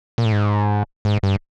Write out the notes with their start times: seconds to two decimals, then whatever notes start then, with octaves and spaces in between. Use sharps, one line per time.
0.18 A#2
0.25 A2
0.32 G#2
1.05 G#2
1.23 G2